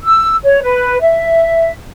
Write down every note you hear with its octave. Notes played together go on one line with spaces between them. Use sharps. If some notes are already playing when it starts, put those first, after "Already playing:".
E6
C#5
B4
E5